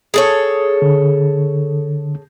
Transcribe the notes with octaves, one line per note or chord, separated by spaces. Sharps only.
G#4 A4 C#5
D3